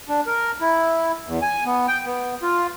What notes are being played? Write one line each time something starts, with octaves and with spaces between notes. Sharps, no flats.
D4
A#4
E4
E2
G#5
B3
G5
B3
F4